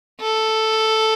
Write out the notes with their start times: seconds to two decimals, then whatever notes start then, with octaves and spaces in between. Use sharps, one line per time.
0.21 A4